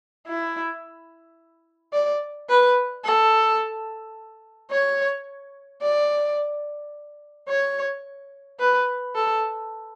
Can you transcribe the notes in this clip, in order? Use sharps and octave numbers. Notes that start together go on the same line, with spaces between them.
E4
D5
B4
A4
C#5
D5
C#5
B4
A4